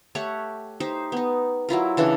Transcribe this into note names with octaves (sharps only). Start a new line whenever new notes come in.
A3 G4 C#5 F#5
D#4 G4 C5
B3 D#4
F#3 E4 F4 A#4
C#3 E3 D4 A4